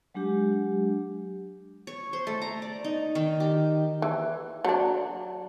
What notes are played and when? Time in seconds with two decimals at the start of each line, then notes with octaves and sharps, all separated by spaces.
0.15 F#3 G#3 D4 G4
1.87 C#5
2.13 C5
2.27 A3
2.42 A#5
2.62 D5
2.84 D#4
3.15 D#3
3.40 G4
4.02 E3
4.64 F#3 D4